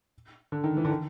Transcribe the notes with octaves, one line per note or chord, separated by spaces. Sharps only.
D3
D#3
E3
D3
D#3